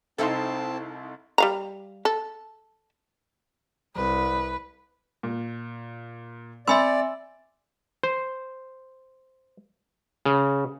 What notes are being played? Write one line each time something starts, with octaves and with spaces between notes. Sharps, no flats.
C2 C4 D#4 E4 A4 F5 A5 C6
G3 F5 A#5
A4
C2 B4
A#2
C4 D5 E5 G#5 B5 C6 E6
C5
C#3